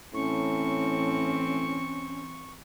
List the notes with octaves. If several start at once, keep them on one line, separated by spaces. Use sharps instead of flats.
A2 E3 C4 C#4 C#6